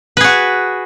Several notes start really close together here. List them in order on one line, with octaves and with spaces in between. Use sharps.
B4 G#4 F#4